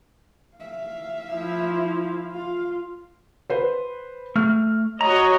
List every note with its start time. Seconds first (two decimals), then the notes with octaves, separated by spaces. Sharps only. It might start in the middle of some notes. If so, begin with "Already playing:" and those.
0.57 E5 F5
1.33 F3 E4
2.31 F4 F5
3.50 B4 C5
4.36 A3 F6
5.01 F#4 C#5 D#5 A#5